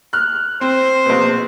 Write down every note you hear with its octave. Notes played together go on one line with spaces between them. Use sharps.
F6 F#6
C4 C5
A#1 B2